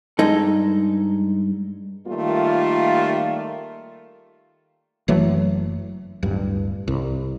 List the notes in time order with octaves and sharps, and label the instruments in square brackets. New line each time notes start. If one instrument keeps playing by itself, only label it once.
[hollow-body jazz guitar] G2 G#3 D#4 A4
[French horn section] D#3 G3 A3 A#3 F4
[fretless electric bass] F#1 E3 F#3 A3
D1 G2
C2